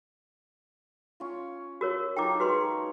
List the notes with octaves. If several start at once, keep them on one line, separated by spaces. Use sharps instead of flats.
C#4 F4
F#4 A#4 C#5
D#4 F4 A4 G5 D6
G#3 F#4 B4 C#5 C6